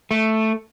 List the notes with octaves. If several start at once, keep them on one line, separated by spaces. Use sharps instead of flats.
A3